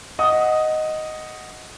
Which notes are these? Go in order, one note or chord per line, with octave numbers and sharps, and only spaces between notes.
D#5 F#5 D#6